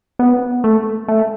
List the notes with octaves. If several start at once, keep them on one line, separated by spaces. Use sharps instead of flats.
B3
A3
A3